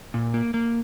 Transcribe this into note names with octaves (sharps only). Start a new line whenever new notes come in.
A#2
A#3
A#3